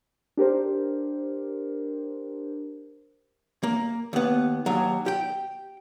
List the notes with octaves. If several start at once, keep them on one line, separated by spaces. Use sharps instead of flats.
D4 G4 A#4 C5
A#3
D#2 B3
D#2 F#3
G4 G5